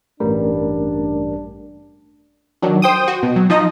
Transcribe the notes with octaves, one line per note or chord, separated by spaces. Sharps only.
A1 G2 G3 A3 C#4 D4 A#4
D#3 F#3 D4
C5 G5 D#6
F#4
B2
F#3
F3 D#4 D#5